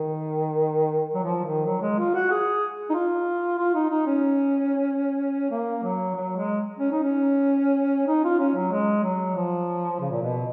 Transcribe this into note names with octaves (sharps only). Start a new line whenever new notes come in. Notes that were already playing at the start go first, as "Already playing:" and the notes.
Already playing: D#3
F#3
F3
D#3
F#3
G#3
F4
F#4
G#4
D#4
F4
F4
D#4
D#4
C#4
A#3
F#3
F#3
G#3
C#4
D#4
C#4
D#4
F4
C#4
F#3
G#3
F#3
F3
C#3
A#2
B2